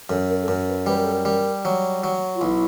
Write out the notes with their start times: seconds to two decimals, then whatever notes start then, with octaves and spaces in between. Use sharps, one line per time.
0.09 F#2 A4
0.29 A#4
0.41 A4
0.48 F#2 A#4
0.68 B4
0.86 G3 B4
0.95 A#4
1.04 A4
1.13 A#4
1.25 G3
1.65 F#3
2.04 F#3
2.35 F4
2.41 B1 E4